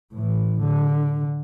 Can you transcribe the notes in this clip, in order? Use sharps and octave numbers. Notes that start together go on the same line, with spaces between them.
A2 E3
D3